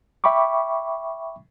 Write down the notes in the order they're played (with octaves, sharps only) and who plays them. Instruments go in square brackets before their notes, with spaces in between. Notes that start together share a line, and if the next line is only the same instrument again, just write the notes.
[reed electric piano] E5 G5 B5 C#6 D6